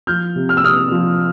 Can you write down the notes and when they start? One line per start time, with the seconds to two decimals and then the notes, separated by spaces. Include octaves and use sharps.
0.07 F3 F6 G6
0.36 C3
0.49 F6
0.57 E6
0.64 C3 D#6 F6
0.92 F3